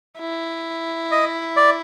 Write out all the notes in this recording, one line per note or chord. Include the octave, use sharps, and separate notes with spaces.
E4
D#5
D5